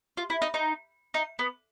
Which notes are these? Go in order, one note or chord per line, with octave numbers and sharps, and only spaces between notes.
F4
E4
D#4
D#4
D#4
B3